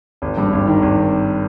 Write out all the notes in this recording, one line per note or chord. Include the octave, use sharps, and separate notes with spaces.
G#1
G2
G#1
D#3
G#1